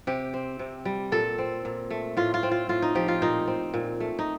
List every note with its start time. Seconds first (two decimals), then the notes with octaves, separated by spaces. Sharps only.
0.07 C3 G4
0.34 C4
0.59 C3
0.85 G3
1.12 A#2 A4
1.38 C4
1.65 A#2
1.90 A3
2.17 A2 F4
2.34 F4
2.43 C4
2.51 F4
2.69 A2 F4
2.82 D#4
2.95 F3 G4
3.08 F4
3.22 A#2 D#4
3.47 C4
3.74 A#2
4.00 A3
4.19 D#4